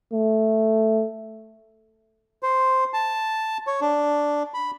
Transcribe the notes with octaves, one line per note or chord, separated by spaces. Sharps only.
A3
C5
A5
C#5
D4
B5